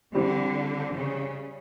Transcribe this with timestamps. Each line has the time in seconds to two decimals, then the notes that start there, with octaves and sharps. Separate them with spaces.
0.15 D3 G3 C4 E4 G4
0.94 C#3